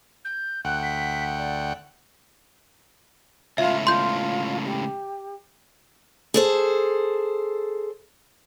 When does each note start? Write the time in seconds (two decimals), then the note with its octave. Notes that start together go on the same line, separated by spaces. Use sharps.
0.25 G6
0.65 D2 F#5 G5 F#6
0.83 B6
1.39 D5
3.58 C#2 A2 F4 E5
3.87 F4 C6 G6
4.65 G4
6.34 G#4 A4 C5